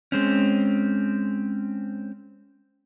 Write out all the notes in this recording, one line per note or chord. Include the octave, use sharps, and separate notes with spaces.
G#3 C4 C#4